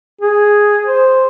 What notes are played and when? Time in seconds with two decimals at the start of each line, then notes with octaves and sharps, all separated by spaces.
0.21 G#4
0.86 C5